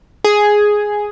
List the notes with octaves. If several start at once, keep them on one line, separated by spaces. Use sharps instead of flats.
G#4